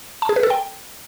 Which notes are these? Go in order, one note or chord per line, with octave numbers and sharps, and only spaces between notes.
A5
G#4
B4
A4
G5